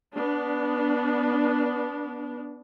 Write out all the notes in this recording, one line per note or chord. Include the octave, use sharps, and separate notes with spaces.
B3 D4